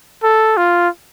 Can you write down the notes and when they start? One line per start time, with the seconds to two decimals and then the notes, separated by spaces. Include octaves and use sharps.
0.23 A4
0.57 F4